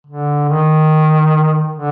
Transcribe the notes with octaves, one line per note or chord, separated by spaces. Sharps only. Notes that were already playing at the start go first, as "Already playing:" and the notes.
D3
D#3
D3